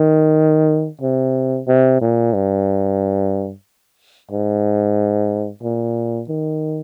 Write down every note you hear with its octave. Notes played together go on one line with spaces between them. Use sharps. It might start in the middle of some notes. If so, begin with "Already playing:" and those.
Already playing: D#3
C3
C3
A#2
G2
G#2
A#2
D#3